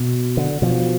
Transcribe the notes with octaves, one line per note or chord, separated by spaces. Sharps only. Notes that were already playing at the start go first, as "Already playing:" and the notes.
Already playing: B2
D3
B2 F3